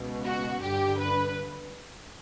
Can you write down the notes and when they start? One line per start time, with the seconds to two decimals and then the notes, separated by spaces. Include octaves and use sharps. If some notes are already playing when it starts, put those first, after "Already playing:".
Already playing: C#2 B2
0.24 F#4
0.61 G2 D3 G4
0.98 B4